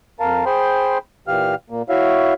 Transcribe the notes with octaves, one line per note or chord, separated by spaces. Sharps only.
F2 A#4 F5 A5
G#4 C5 G5 B5 C6
A#2 E3 G4 F5 F6
A#2 A#3
E4 F#4 C#5 E5 F5